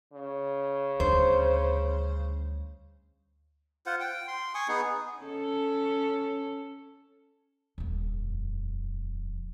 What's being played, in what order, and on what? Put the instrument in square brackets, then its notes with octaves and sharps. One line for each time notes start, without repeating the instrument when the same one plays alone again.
[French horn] C#3
[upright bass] D2 G3 [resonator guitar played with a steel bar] C5
[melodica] F4 C5 F#5
G5
C6
G#5 C#6 D#6
B3 D#4 G#4
[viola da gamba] C#4 A4
[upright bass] D#1 F2